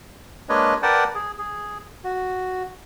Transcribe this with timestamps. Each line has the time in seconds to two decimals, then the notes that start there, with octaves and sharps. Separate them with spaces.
0.49 G#3 A#3 D4 B4 C#5 D#5
0.83 A#4 B4 D5 F#5 G5 A5
1.15 G#4
1.38 G#4
2.04 F#4